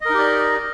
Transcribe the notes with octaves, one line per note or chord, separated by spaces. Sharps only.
D#4 G4 A#4 D5 D#5